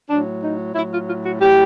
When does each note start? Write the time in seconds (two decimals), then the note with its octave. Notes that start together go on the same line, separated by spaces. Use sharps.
0.09 A2 F#3 D4
0.42 D#4
0.75 A2 F#3 E4
0.91 F4
1.08 F4
1.24 F#4
1.41 A2 F#3 G4